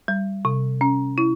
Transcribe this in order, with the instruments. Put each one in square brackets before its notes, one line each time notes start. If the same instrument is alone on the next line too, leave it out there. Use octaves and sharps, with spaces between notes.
[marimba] G3
C3
C#4
E4